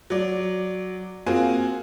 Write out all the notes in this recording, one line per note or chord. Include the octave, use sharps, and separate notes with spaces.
F#3 D5
A#3 C4 F4 F#4 G#4 G#5